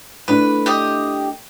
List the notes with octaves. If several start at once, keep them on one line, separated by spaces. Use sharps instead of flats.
A3 D4 E4 B4
G4 D#5